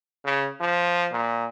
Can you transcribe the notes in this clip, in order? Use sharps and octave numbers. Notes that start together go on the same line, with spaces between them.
C#3
F3
A#2